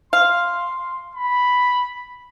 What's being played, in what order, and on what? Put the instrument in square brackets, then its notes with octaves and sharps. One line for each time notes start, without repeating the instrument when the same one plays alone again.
[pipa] F5 [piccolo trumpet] C6
[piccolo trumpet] B5